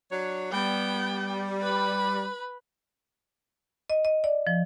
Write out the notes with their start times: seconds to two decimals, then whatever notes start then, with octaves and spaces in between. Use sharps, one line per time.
0.10 F#3 D4 C#5
0.52 G3 B3 G5
1.61 B4 B5
3.90 D#5
4.05 D#5
4.24 D5
4.47 F3